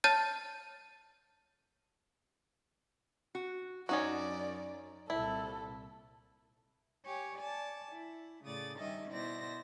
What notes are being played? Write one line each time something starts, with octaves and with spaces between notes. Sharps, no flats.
C#5 A5 F6 G6 A6 D#7
F#4
F#2 C#4 D#4 F#4 C#5 D5
C2 A#2 E4 A4
G4 C#5 G#5
D5 G#5 A5
E4
A2 C#3 D5 D#6 A6
G2 D#3 G3 C#4 D#5 E5
B2 E4 C5 D5 A#6